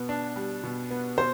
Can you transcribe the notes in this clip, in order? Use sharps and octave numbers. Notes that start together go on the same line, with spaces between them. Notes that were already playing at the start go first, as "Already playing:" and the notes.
Already playing: B2 B3
D4
G3
B2
B3
B2 C5